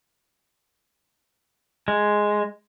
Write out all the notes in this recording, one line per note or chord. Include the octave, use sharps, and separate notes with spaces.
G#3